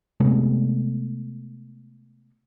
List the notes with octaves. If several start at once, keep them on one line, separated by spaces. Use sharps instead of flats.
C3 G#3 A3 B3